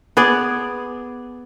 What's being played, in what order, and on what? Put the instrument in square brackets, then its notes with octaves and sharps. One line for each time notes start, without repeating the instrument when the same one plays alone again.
[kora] B3 G#4 D5